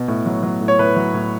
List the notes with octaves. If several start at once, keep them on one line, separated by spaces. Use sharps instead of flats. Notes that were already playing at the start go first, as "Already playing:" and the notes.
Already playing: B2
A2
F#3
F#3
A2
C#5
A2 B4
F#3
A2